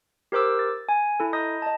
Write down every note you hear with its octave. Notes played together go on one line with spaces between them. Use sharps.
G4 A#4 C5 D6 E6
A6
G#5
E4 A4
D#5 A#5 D#6 G6 A#6
D#5 A5